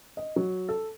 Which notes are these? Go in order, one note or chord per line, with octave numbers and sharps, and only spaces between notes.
D#5
F#3
A4